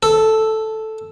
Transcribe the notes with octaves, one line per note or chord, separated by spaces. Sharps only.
A4